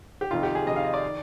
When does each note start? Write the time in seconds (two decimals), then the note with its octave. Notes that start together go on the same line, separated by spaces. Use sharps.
0.21 G4
0.31 F2 C3 D#3 F4
0.43 G4
0.55 G#4
0.66 F2 C3 D#3 D#5
0.76 F5
0.84 D#5
0.94 D5
1.04 D#3